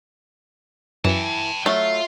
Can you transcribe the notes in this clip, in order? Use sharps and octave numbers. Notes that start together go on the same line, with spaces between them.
F#2 E3 G5 A5
F#3 A3 F4 E5